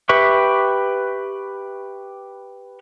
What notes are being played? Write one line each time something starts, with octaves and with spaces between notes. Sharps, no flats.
G4 B4 E5 C#6